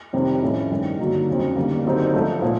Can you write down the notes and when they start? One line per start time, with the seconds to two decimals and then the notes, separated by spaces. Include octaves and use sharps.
0.13 F2 C3 D#3 G3
0.42 A2 F3 A3 C#4 E4
0.71 G2 D#3 G#3
0.99 G2 D3 F#3 A#3 D#4
1.28 F2 C#3 F#3
1.56 G1 G2 D#3 G3 A#3
1.85 F#2 D3 G3 C4 D#4
2.14 G#2 F3 A3
2.42 A#2 F3